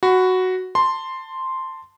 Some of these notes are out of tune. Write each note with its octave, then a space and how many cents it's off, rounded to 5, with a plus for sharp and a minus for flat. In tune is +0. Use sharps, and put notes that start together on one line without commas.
F#4 +0 B5 +25
A5 +20 C6 +0